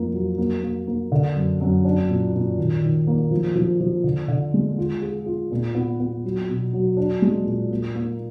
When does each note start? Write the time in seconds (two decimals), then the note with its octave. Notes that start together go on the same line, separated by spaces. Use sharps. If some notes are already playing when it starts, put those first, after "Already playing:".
Already playing: F2 F3 A#3
0.14 F#3
0.38 A#3
0.63 A#3
0.87 A#3
1.12 D3
1.35 F#2
1.61 F#2
1.85 D4
2.09 A#2
2.34 A#2
2.58 D#3
2.82 D#3
3.07 A#3
3.31 F3
3.55 F3
3.80 F3
4.04 D3
4.28 D3
4.54 G#3
4.78 F4
5.02 G#4
5.26 F4
5.51 A#2
5.75 B3
6.00 B3
6.25 F#3
6.49 B2
6.73 F#3
6.97 D4
7.22 G#3
7.47 A#2
7.70 A#3
7.95 A#3